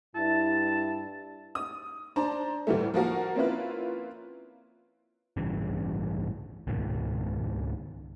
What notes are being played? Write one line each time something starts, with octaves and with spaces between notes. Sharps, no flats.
G2 E4 A5
D#6
D4 C5 A5 A#5
D2 A2 E3 G3 A3
F3 A#3 F#4 A#4
A#3 C4 C#4 E4 F4 B4
A1 G2 C#3 E3
C#2 G#2 B2 D#3